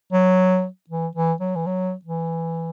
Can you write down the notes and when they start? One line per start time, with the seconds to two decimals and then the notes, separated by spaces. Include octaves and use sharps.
0.12 F#3
0.90 E3
1.15 E3
1.40 F#3
1.56 E3
1.67 F#3
2.05 E3